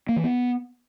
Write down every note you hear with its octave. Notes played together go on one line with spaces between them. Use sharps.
A#3
E3
B3